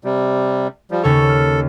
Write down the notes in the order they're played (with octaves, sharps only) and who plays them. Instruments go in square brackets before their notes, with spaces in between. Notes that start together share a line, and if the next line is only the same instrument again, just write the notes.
[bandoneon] C3 G3
F3 G3
[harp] D#2 C#3 C#5 [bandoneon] A4
[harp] F6